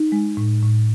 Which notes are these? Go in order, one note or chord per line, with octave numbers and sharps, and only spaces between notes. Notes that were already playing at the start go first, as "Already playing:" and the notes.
Already playing: D#4
G#3
A2
A2